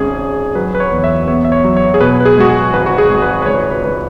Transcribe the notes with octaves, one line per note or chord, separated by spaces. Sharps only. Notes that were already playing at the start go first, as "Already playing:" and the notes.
Already playing: G#1 C#4 G#4
C#4
F#3 B4
B4
C#5
E2
C#5
E5
B3 C#5
E5
C#5
F#3
C#5
G#4
B2 B4
B4
G#4
G#3 F#4
G#4
G#1 B4
F#4
G#4
G#1
B4
B4
C#2 C#5
B4
C#2 B4